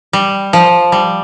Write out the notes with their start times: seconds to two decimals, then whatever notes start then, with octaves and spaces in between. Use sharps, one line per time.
0.13 G3
0.53 F3
0.92 G3